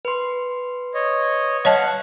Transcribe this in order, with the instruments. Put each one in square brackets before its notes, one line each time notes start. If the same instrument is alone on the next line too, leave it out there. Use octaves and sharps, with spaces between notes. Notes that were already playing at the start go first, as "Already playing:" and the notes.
[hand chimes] B4 C6
[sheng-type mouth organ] C#5 D#5
[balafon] C#5 D#5 A5 [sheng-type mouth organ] F5 F#5